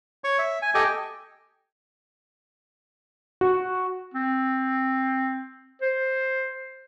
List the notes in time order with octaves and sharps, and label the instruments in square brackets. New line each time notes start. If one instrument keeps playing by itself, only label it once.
[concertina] C#5 C#6
E5
G#5
G4 A4 D#5 G5 G#5
[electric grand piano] F#4
[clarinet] C4
C5